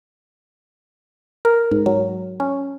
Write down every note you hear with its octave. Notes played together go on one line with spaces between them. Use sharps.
A#4
G#2
F#3
C#4